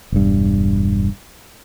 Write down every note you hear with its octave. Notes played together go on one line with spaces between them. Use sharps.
E1 G2